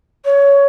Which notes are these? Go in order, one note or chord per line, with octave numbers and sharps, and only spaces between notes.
C#5